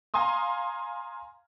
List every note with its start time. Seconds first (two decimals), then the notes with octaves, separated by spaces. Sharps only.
0.14 F5 G#5 A#5 C6 D#6